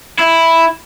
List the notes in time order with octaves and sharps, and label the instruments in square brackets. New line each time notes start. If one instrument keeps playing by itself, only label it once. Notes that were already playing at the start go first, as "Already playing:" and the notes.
[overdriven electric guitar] E4